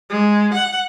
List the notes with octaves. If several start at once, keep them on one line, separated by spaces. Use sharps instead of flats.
G#3
F#5